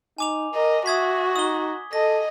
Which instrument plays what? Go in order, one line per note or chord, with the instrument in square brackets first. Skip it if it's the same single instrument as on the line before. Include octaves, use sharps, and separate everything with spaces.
[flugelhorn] D#4 [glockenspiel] G#5 D6 F7
[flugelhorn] A#4 [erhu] D#5
[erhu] F#4 [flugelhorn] E5 [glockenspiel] D#6 G#6 B6
[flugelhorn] D#4 [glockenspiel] D#6 G7
[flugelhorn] A4 [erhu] D#5 [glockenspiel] A#6